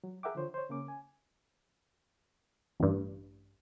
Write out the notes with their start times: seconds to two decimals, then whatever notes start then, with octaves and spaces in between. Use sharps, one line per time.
0.04 F#3
0.23 G#4 A#4 E5 F#5 G5 D6
0.35 D3 F3 C5 C#5
0.54 C5 C#5
0.69 C#3 A#3 C#4 D6
0.88 G#5
2.80 A1 G2